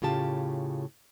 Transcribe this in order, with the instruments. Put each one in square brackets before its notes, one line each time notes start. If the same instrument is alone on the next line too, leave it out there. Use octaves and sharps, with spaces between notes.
[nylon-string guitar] A2 C#3 F4 G4 A5